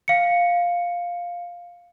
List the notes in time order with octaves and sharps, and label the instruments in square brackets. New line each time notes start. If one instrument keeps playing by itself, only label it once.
[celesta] F5 C#7